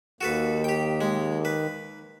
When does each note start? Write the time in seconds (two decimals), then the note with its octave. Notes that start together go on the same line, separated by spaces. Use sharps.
0.21 D#2 F#4 A4 B4
0.64 G4 G5
1.01 G#3
1.45 B4